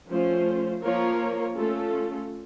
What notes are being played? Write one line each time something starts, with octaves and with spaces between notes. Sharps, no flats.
F3 A3 C#4 F4 C5
F3 A#3 F4 A#4 C#5
A3 C#4 F4 A4